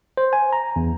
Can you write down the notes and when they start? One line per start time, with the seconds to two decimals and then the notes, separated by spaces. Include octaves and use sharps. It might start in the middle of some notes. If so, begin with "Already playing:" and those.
0.17 C5
0.33 G#5
0.53 A#5
0.76 E2